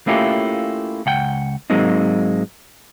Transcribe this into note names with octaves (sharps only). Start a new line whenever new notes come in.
A3 A#3 C#4 E4 F4 G4
C#2 F#5 G5
G#2 F#3 G#3 A#3 C4 D#4